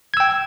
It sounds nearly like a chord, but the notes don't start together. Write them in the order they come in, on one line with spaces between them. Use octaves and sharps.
G#6 E6 G5